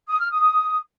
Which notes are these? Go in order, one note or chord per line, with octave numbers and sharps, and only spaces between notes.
D#6
F6
D#6